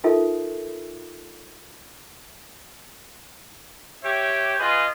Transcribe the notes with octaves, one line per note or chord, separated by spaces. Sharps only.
D#4 F4 A4 A#4 E5
G4 C#5 E5 G5
F4 G#4 B4 D#5